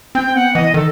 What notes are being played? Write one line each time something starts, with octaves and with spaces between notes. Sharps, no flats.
C4 G5
B3 F#5
E3 D#5
D#3 A4